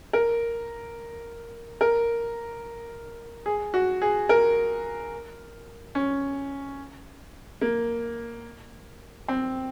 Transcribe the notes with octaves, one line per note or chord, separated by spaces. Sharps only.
A#4
A#4
G#4
F#4
G#4
A#4
C#4
A#3
C4